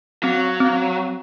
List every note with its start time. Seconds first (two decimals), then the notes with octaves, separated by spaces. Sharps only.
0.23 F#3 C4
0.60 C4